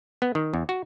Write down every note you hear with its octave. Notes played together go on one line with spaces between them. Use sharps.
B3
D#3
E2
F#4